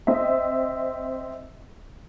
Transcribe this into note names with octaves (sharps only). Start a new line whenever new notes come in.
C4 D#5 E5